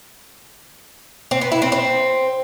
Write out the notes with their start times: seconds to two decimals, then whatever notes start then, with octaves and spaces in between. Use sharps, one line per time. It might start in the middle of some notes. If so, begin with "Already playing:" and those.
1.31 C4
1.41 B3
1.52 E4
1.62 C4
1.72 C4